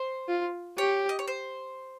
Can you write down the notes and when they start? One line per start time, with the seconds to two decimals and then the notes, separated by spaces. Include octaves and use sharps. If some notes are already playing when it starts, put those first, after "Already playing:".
Already playing: C5
0.28 F4
0.78 G4 C#5
1.09 D#5
1.19 C#5
1.28 C5